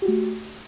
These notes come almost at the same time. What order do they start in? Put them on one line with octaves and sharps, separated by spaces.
G4 F#4 A3